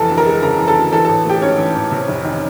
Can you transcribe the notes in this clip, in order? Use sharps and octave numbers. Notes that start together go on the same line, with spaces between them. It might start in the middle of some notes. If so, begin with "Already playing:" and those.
Already playing: F1 E3 A4 A5
D2
A#4 A#5
G#3
C#3 A#4 A#5
E3
A4 A5
D2
E3 A4 A5
A1 A4 A5
A3 G4 G5
G#2 C#4 C#5
E3
A1
C3
F1
D#3